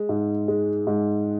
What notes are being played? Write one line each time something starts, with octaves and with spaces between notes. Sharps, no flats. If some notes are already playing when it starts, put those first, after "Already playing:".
Already playing: G#3
G#2
G#3
G#2